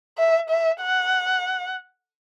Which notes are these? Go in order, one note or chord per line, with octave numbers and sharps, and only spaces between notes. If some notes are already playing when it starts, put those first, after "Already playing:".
E5
E5
F#5